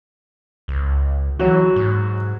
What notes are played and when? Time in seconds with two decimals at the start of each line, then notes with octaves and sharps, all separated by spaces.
0.68 C#2
1.39 E3 F#3 F#4
1.76 G#2